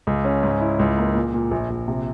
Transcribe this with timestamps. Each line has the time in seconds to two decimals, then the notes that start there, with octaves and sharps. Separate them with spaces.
0.07 C#2
0.25 C#4
0.43 G#2
0.61 E4
0.79 C#2
0.97 A#3
1.15 A#2
1.34 A#2
1.51 A#1
1.70 A#1
1.88 C3